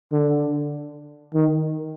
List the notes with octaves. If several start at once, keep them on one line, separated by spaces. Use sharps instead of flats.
D3
D#3